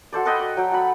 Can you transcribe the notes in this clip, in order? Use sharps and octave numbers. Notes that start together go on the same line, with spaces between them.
F#4 A4 C5 D5
A4 B4 D#5 G5
D5
F#3 G5
F#4 B5